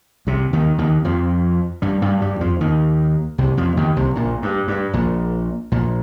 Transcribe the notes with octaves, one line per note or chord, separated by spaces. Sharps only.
C2 C3
D#2 D#3
D#2 D#3
F2 F3
G2 G3
G2 G3
G2 G3
F2 F3
D#2 D#3
C2 C3
F2 F3
D#2 D#3
C2 C3
A#1 A#2
G2
G2
A#1 A#2
A#1 A#2